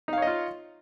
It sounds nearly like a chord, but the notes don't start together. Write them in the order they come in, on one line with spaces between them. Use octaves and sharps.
D#4 F5 C#5 D#5 F4